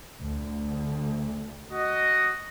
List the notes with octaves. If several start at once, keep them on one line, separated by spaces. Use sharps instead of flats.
D2
F#4 D#5